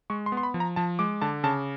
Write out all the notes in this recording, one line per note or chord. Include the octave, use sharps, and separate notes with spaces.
G#3 C#6
C6
B3
C6
B5
F3
A#5
F3 A5
G#3 D6
D3 A5
C#3 A5